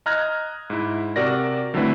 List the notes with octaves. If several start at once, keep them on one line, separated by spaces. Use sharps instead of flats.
D#5 A#5 F6 F#6 G#6 A#6
G#2 E4
C3 F#4 A#4 D5 A#6
D3 F#3 A3 C4 E4 B4